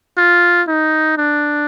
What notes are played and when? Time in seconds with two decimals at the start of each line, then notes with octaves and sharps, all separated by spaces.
0.17 F4
0.67 D#4
1.17 D4